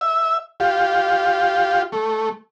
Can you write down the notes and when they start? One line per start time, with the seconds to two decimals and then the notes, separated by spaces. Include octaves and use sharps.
0.01 E5
0.60 F4 G4
1.92 A3